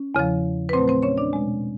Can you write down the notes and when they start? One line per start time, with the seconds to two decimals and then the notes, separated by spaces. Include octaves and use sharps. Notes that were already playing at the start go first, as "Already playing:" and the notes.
Already playing: C#4
0.15 E2 C#3 F3
0.69 B4
0.73 A#2 F#3 A3 C4 C5
0.88 C4 C5
1.03 C#4 C#5
1.18 D4 D5
1.33 B2 G#3